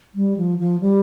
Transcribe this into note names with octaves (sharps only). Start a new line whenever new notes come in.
G3
F3
F3
G3